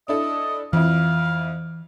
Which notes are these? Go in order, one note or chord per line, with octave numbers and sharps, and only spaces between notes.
D4 E4 A4 D#5
F2 E3 E4 F5